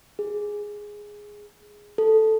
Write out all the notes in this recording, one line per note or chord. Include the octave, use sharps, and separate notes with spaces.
G#4
A4